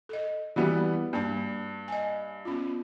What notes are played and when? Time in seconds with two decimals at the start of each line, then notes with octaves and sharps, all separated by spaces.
0.09 A4 D#5
0.56 E3 G3 B3 F#4 G4
1.13 G2 A#3 A5
1.88 D#5 G#5
2.45 B3 C#4 F4